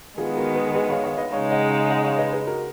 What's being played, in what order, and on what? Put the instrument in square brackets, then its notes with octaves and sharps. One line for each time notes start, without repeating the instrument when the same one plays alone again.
[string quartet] D#3 G#3 B3 [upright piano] F4 G#4
[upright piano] F#4 A#4
G#4 B4
G#4 B4
C#5 F5
C#5 F5
B4 D#5
[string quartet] C#3 G#3 D#4 [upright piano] C#5 F5
[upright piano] D#5 F#5
C#5 F5
D#5 F#5
C#5 F5
B4 D#5
G#4 B4
F#4 A#4